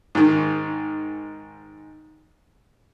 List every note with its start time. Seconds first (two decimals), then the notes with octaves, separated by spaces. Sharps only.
0.15 G#2 D#3